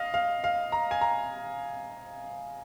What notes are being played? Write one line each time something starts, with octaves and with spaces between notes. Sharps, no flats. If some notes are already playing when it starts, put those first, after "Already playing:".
Already playing: D#5 F5
F5
F5
A#5
G#5
A#5